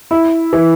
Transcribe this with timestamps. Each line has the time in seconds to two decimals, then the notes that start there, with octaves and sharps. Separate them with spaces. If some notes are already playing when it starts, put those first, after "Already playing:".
0.11 E4
0.53 E3